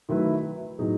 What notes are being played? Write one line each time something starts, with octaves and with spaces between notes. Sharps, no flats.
D#3 F#3 A3 E4 B4
A2 F#3 B3 D#4 G#4